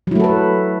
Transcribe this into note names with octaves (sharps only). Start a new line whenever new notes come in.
F#3 A3 E4 A4 B4